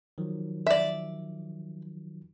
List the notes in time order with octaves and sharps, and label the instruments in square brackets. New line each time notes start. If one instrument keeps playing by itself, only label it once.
[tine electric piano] D#3 F3 F#3
[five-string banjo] D5 E5